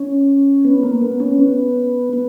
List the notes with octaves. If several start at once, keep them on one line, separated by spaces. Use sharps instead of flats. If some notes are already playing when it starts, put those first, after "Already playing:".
Already playing: C#4
B3
A#3
B3
C#4
B3
B3